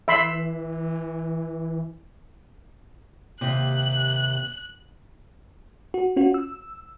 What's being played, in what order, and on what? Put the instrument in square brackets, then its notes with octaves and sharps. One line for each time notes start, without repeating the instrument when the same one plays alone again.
[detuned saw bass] E3 [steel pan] E5 B5 C6
[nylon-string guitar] D#2 C3 [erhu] F#6
[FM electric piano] F#4
C#4 F4 F#4
E6